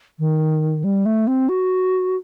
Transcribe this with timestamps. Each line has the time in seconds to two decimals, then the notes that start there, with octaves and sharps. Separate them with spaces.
0.19 D#3
0.84 G3
1.06 A3
1.27 C4
1.49 F#4